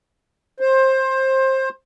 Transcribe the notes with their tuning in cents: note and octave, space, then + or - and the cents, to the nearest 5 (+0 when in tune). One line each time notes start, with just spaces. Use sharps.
C5 +20